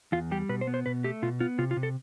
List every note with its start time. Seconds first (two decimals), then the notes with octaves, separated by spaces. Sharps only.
0.12 E2 F4
0.31 G3 G4
0.49 B2 B4
0.61 C5
0.67 B3
0.74 C5
0.86 B2 B4
1.04 A3 G4
1.22 B2 F4
1.40 B3 F4
1.58 C3 F4
1.71 F4
1.77 C3
1.83 A4